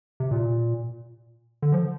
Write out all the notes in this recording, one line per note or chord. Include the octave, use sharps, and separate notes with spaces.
C3
A#2
D3
F3